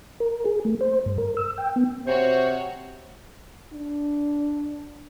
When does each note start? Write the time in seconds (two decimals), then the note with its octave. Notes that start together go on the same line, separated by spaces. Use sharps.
0.20 A#4
0.45 G#4
0.65 A3
0.81 C5
1.06 G2
1.18 A#4
1.37 E6
1.58 G5
1.76 B3
2.07 C3 F#4 C5 C#5
3.73 D4